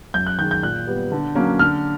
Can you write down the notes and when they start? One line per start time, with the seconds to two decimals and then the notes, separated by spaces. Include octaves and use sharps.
0.14 F#2 G6
0.27 F#6
0.39 D#3 G#3 G6
0.51 G6
0.63 A#2 F#6
0.87 G3 B3
1.12 D3
1.35 F#3 A#3 C#4
1.59 D3 F6